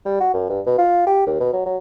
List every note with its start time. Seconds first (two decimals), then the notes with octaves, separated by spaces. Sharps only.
0.05 G3
0.20 F#4
0.34 F#2
0.50 G2
0.66 B2
0.78 F4
1.07 G4
1.27 D#2
1.40 B2
1.53 F#3
1.66 F#3